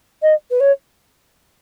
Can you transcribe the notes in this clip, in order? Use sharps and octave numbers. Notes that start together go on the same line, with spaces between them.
D#5
B4
C#5